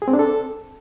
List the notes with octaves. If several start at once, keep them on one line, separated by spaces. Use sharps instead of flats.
G#4
C4
D4
A4